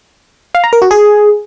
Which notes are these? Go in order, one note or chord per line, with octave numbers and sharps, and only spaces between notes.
F5
A#5
A#4
F#4
G#4